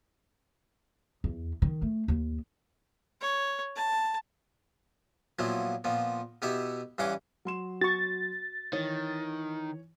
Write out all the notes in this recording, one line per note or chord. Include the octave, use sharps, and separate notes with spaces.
E2
D#3
A3
D#2
C#5
A5
A#2 F3 F#3 B3 E4
A#2 F3 B3
B2 B3 E4 G4 E5
G2 E3 C#4 F#5 C6 D6
F#3 C6 E7
F#4 C#6 A6
D#3 E3 C#5